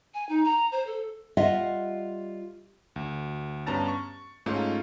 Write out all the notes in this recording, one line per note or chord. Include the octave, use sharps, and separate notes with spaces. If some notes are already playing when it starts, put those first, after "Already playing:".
G#5
D#4
A#5
C5
A4
G3 F4 D#5 E5 F#5
D2
G2 B3 C#4 A5 A#5 A6
C#6
G#2 A3 C#4 D#4 F4